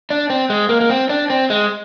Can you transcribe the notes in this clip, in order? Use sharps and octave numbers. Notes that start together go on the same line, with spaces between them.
D4
C4
G#3
A#3
A#3
C4
D4
C4
G#3